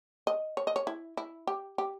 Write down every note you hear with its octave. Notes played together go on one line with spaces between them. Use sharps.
D#5
C#5
D#5
C#5
E4
E4
G4
G4